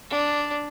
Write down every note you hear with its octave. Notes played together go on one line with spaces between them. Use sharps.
D4